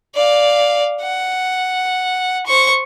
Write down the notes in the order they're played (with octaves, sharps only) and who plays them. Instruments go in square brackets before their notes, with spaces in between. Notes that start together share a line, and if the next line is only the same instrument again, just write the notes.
[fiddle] D5 F5
F#5
C5 C#6